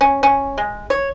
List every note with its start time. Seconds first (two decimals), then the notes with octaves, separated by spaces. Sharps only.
0.01 C#4
0.23 C#4
0.58 G#3
0.90 C#5